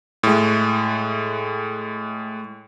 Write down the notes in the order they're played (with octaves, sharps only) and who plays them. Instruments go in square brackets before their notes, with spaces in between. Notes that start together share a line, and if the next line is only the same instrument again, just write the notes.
[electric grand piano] A2 G#3